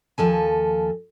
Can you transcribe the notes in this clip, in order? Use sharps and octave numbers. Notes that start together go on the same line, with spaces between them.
D#2 F3 A4 G#5